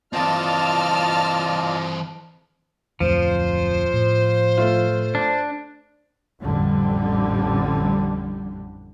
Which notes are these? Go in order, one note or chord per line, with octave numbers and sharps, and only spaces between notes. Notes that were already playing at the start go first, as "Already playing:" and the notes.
E3 C4 F4 D5 D#5 A5 F6
D1 F2 F3 A3 C5
A2
A3 F4
D4
A1 F2 D3 G3